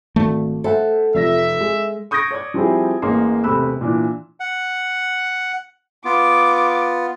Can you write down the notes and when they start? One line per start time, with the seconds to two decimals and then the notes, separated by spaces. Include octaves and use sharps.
0.16 G#1 A3
0.64 A4 C5 E5 F#5
1.15 F1 F2 E5 A#6
1.61 G#3
2.11 C#6 D#6 G6 G#6 A#6 D7
2.31 C#5 D5 G#6
2.54 F3 G3 C4 E4 G#4
3.02 A1 G#3 A#3 C#5 C6
3.43 E1 C3 A3 B5 E6 F#6
3.81 A#2 E3 D4
4.40 F#5
6.05 B3 F4 D6